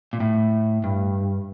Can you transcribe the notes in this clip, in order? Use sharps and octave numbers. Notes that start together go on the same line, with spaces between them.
A#2
A2
G2